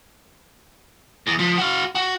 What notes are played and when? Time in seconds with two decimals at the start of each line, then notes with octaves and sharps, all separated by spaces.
1.27 E2
1.39 F3
1.58 F#4 F5
1.95 F#4